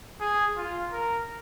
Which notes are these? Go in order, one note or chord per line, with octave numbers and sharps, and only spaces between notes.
G#4
F4
A#4